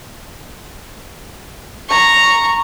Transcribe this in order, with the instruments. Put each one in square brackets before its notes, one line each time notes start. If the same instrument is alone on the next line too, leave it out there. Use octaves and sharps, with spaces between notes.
[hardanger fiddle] A#5 C#6